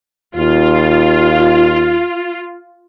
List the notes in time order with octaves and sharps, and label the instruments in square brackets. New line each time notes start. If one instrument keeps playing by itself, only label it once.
[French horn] D#2 [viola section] F4